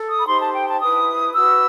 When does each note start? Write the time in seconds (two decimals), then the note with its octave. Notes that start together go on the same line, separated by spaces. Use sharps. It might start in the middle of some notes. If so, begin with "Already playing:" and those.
Already playing: A4
0.09 D#6
0.18 B5
0.26 D#4 G4 C5 C6
0.40 A5
0.54 G5
0.67 A5
0.80 E4 B4 D#6
1.34 F#4 B4 E6